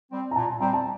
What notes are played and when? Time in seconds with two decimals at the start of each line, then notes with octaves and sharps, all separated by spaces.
0.12 G3 C4
0.31 A#5
0.36 A#2 A5
0.60 G3 C4 A#5
0.73 A5